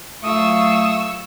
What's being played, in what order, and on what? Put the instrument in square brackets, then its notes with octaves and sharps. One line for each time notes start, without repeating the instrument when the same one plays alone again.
[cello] F#3 F4 [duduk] A3 [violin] C#6 E6 [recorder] D#6